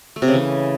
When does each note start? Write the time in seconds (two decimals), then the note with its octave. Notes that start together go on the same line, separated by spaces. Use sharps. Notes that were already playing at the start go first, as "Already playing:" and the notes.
0.16 A3
0.22 C3
0.28 C#3
0.34 E3